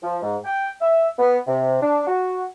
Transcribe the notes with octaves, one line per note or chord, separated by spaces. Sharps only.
F3
G#2
G5
E5
B3
C3
D4
F#4